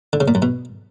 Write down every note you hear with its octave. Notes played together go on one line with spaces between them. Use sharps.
D3
C#3
A#2
F#2
B2